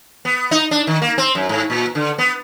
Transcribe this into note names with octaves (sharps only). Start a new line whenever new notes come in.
B3
D#4
D4
D#3
A#3
C4
F#2
G#2
A#2
D3
B3